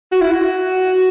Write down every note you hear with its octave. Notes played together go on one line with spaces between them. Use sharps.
F#4
E4
F#4